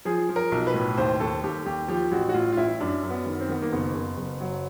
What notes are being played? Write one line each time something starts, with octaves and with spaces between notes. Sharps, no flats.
F3 G#4
F3
A#4
B1
B4
A2
D#2 C5
D#2 A4
D#2 G4
D#2 G4
F3 G4
A1 F#4
F#4
A2 F4
F4
A1 E4
F#2 D4
F#2
B3
D#3
C4
D#3 B3
A#3
F#1 B3
F#1
F#1
F#3